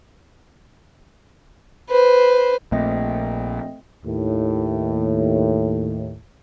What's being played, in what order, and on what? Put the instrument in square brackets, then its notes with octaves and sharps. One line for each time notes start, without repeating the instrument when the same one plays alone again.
[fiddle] B4 C5
[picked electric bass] A#1 A#2 [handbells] A3 C4 D#5
[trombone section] D#2 A2